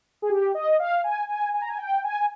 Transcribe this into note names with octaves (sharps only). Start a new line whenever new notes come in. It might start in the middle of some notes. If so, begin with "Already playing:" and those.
G#4
G4
D#5
F5
G#5
G#5
G#5
A#5
G#5
G5
G#5